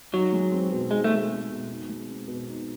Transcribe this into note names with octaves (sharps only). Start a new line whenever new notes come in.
F#3 D#4
G#3
C4
B2
G#3 D#4
A3
G#3
C4
B2
D#4
G#3
C4
B2
D#4